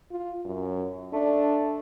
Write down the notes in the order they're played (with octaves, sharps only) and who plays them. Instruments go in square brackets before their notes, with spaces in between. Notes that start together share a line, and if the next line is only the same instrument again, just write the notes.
[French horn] F4
F#2
[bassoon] A3 [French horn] D4